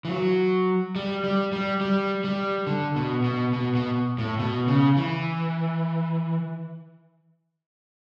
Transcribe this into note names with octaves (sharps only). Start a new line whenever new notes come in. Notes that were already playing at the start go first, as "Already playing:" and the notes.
E3
F#3
G3
G3
G3
G3
G3
D3
B2
B2
B2
B2
A2
B2
C#3
E3